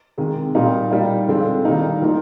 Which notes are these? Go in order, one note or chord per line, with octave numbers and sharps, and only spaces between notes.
C3 D#3 G#3
A#2 G3 A#3 D#4
G3 A#3 D#4
D3 F3 G#3 C4 F4
D#3 G3 A#3 D#4
F3 A#3 D#4